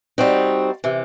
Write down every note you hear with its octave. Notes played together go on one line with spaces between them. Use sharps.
G3 C4 D#4 F#4
C3 E3